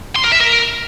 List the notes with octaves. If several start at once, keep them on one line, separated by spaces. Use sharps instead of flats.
C6
A#4
E5
A#4